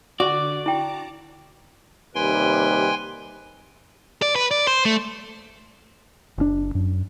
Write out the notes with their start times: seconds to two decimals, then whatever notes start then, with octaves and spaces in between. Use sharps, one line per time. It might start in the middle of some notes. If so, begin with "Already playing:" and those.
0.20 D3 F#4 D5
0.66 E4 G5 A5 A#5 D6
2.15 D#2 C3 G3 B4 G5 G#5 C6
4.22 D5
4.36 B4
4.51 D5
4.67 C5
4.85 A3
6.38 F#1 C3 D4
6.75 F#2